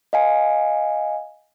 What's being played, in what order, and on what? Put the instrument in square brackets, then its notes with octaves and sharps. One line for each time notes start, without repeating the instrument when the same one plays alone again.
[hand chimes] D#5 F5 G#5